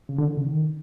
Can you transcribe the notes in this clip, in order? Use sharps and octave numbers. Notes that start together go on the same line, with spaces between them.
C#3
D3
E3
C#3
D#3